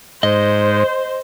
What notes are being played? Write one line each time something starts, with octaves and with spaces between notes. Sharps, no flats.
G#2 C5 D#5